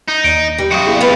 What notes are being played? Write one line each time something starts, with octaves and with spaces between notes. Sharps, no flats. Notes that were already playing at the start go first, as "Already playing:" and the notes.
D#4
D#2 D5 D7
G3
C3 F#3 F#4 F5 D#6 C#7
B3 E4 G#4
D2 C3 F4 B4 F5